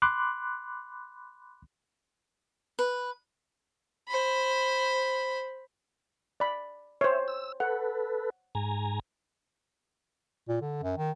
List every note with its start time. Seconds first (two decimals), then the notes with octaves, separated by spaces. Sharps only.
0.02 B5 C6 D6 F#6
2.79 B4
4.08 C5 B5
6.40 D5 B5
7.01 C5 C#5 E5
7.28 E6
7.60 A4 B4 F#5
8.55 G#2 G#5 A#5
10.48 A#2
10.62 D3
10.83 F#2
10.97 D#3